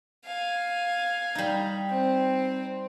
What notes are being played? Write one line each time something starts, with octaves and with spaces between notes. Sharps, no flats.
F5 G#5
G3 D#4
C4